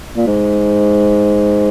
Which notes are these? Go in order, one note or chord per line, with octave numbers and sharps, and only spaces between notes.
A#2
G#2